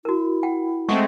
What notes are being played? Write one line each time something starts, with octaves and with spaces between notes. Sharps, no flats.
E4 F#4 A#4
F#5 G5
G#3 A3 C4 F#5 C#6